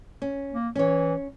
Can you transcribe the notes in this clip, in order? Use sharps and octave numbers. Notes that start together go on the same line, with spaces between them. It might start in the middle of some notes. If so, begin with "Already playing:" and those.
C#4
A#3
E3 C#4 C#5